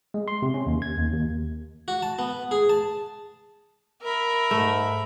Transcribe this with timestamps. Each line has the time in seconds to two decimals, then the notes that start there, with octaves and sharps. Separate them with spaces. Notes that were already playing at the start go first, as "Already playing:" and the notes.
0.14 G#3
0.28 C6
0.42 C3
0.54 C#4
0.66 D#2
0.82 G#6
0.97 D#2
1.13 D#2
1.88 F#4
2.03 A5
2.19 B3
2.51 G#4
2.69 A5
4.03 A#4 E5 B5
4.51 G#2 A3